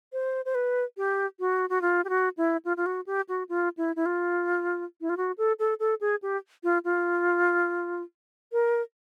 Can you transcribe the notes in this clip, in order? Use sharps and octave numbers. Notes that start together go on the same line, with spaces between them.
C5
C5
B4
G4
F#4
F#4
F4
G4
F#4
E4
F4
F4
F#4
G4
F#4
F4
E4
E4
F4
E4
F4
F#4
A4
A4
A4
G#4
G4
F4
F4
A#4